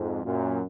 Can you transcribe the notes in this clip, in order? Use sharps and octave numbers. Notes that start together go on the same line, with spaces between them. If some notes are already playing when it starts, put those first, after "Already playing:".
Already playing: F2 G#2
F#2 A#2